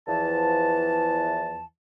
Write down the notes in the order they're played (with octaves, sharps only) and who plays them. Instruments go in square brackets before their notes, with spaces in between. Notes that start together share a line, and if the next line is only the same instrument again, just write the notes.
[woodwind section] E2 E3 F3 A5